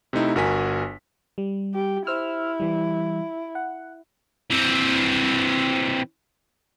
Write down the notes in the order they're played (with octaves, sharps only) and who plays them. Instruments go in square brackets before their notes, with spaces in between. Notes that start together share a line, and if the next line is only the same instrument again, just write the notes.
[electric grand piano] C3 A3 D#4 E4
G1 F#4 A#4 D#5 G#5 B6
[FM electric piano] G3
[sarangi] G4
[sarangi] E4 [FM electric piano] C5 E6 F6
[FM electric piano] E3 G3
F#5
[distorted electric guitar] E3 C4